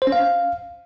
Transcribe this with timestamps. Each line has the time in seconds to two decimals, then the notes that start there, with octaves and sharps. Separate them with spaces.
0.02 C5
0.07 C#4
0.12 F5